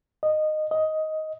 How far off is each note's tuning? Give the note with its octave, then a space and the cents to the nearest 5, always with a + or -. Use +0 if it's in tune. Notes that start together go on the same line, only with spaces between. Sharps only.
D#5 -15
D#5 +10